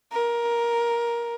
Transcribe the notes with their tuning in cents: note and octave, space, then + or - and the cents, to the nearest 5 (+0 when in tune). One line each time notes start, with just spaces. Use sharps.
A#4 +15